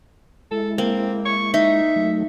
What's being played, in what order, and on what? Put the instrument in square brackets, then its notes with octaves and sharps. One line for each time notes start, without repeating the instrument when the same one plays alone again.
[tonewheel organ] G#3 E4 [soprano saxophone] A4
[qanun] A#3 [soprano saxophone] C4
[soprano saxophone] C#6
[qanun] D#4 [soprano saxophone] E5
[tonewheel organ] F#3 A3